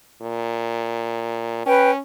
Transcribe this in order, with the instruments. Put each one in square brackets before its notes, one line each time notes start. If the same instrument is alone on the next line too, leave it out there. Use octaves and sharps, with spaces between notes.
[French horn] A#2
[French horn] C#4 [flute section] B4 G5